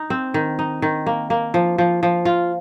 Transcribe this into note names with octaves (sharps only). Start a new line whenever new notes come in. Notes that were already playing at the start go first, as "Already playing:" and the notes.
Already playing: D#4
C4
D#3
D#4
D#3
A#3
A#3
F3
F3
F3
F4